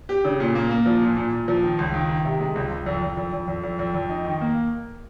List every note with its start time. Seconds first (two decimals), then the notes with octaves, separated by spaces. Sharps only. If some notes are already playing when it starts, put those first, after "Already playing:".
0.09 G4
0.25 C#3
0.40 A#2
0.55 A#3
0.71 A#3
0.86 F3
1.02 A#2
1.17 A#2
1.32 A#2
1.48 F3
1.63 D#3
1.79 C#2
1.94 D#3
2.09 D#3
2.25 C3
2.40 G#3
2.55 C#2
2.71 C#2
2.86 F2
3.02 F2
3.17 F2
3.33 F2
3.48 F2
3.64 F2
3.79 F2
3.94 F2
4.10 D#4
4.25 D#3
4.41 A#3